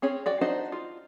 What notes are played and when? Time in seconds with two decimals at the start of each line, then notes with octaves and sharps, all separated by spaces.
0.02 C4 C#4 G#4 C#5
0.26 F#4 D5 G5
0.41 D4 D#4 F#4 C5 D#5
0.72 F4